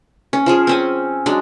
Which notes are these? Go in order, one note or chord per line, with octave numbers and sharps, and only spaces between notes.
C#4
F3 F4 G#4
C4 C#4 G#5
F#3 G#3 D4